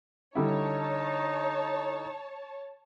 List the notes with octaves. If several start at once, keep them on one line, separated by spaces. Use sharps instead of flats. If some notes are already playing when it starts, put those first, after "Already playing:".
D3 G3 D#4 E4 C#5 A5